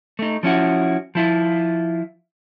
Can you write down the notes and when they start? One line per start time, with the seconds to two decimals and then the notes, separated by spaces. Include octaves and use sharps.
0.19 A3 D#4
0.43 F3 C#4 E4 F#4
1.15 F3 E4 F4